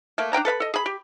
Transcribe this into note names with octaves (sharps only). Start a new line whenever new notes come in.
A3 A#3
D4 B4 G5 A#5
A4 B4 F5 B5
A4 D#5
G#4 B5
G4